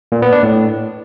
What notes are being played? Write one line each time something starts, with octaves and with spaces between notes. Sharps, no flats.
A#2
B3
D4
A2